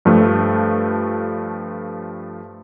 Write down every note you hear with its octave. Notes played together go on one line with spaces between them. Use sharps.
G2 F3 A3